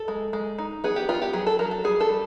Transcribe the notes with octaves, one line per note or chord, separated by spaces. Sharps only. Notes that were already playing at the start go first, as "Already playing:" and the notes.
Already playing: A4
G#3
G#3
D#4
B3 G#4
G4
B3 F4
G4
F#3 G#4
A4
F#3 A#4
A4
G3 G#4
A4
G3